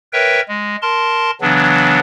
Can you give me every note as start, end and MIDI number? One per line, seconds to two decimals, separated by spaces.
0.13 0.41 70
0.13 0.41 71
0.13 0.41 73
0.13 0.41 76
0.13 0.41 79
0.48 0.76 56
0.82 1.31 70
0.82 1.31 81
0.82 1.31 84
1.41 1.99 49
1.41 1.99 52
1.41 1.99 54
1.41 1.99 59
1.41 1.99 62